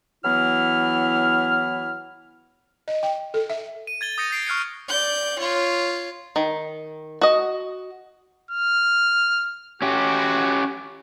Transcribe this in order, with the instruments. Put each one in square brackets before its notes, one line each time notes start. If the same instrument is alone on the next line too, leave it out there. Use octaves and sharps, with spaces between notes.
[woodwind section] E3 F#3 B3 E4 F6
[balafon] D#5
G5
A4
E5
[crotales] D#7
G#6 A6 G7
D#6 G6 A#6 C#7 D#7
G6 A#6 C7 D7
C#6 F6 F#6 G#6 C#7
[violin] D5 G6
F4 C#5
[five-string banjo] D#3
F#4 D#5
[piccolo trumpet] F6
[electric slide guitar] C#4 G4 [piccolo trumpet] F#4